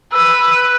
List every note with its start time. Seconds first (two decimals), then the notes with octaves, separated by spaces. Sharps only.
0.12 B4 E6
0.56 F#6